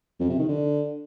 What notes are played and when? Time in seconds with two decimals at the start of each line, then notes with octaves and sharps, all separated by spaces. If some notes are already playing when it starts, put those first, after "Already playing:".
0.20 F2
0.29 C3
0.39 D#3
0.48 D3